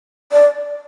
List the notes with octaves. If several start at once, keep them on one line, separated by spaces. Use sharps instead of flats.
D5